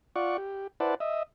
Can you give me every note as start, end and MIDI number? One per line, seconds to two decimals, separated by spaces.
0.16 0.37 65
0.16 0.37 74
0.16 0.37 78
0.16 0.37 85
0.38 0.67 67
0.80 0.94 64
0.80 0.94 71
0.80 0.94 72
0.80 0.94 74
0.80 0.94 78
0.80 0.94 81
1.00 1.23 75
1.00 1.23 76